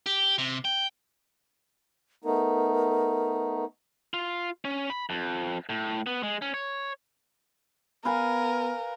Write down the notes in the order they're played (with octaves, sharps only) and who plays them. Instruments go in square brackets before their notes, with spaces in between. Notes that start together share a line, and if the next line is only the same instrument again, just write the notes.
[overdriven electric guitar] G4
C3
G5
[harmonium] A3 B3 D#4 [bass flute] A#4
[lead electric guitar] F4
C#4
B5
F2
A2
B3
G#3
C#4
C#5
[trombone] B3 [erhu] A#4 [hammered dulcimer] B4 F5 G#5